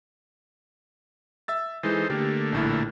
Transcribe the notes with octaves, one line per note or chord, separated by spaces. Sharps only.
E5 E6 A6
E3 G#3 D#4 A4 C5
D3 A3 A#3 G4
A#1 A2 E4